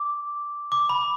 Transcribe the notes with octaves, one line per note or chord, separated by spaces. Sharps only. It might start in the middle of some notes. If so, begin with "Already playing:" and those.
Already playing: D6
D6
B5